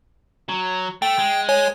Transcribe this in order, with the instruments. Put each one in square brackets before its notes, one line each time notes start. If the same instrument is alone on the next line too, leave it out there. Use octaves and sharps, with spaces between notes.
[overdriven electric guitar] F#3
[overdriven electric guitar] A3 [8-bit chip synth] G5
[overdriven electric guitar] G#3
[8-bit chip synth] C#5 G#5